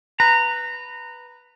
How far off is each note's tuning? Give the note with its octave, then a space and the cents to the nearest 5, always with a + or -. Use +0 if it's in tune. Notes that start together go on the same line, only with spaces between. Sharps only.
B4 +0 A#5 -20